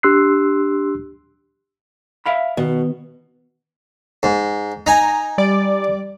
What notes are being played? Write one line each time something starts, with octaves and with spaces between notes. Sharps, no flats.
D4 G4 C6 E6 F#6 C7
E5 F5 B5
B2 D#3
G#2
D#4 G#5 A#5
G3 D5 D6